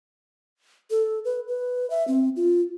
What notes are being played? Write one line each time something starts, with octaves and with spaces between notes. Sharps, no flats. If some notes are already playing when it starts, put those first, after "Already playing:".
A4
B4
B4
E5
C4
F4